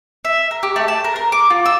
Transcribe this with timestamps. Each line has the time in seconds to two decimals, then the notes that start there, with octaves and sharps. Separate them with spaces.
0.25 E5
0.51 A#4
0.63 G4
0.76 A3
0.88 A5
1.04 A#4
1.16 A#4
1.32 D6
1.50 F4
1.66 E6